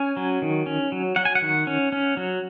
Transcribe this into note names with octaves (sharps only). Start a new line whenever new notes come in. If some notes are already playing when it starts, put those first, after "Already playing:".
Already playing: C#4 G#5
F#3
D#3
C#4
F#3
F#3 F#5
G#5
F#5
D#3
C#4
C#4
F#3